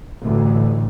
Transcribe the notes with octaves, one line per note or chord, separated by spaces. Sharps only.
A1 D2